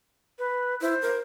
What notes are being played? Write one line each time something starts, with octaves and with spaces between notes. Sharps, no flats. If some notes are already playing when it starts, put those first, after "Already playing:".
B4
E4 C5
A#4